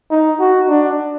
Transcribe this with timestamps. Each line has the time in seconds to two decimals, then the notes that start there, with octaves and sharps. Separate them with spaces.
0.11 D#4
0.40 F#4
0.69 D4